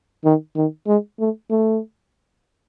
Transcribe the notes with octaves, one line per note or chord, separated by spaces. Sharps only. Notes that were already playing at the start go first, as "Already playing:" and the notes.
D#3
D#3
G#3
A3
A3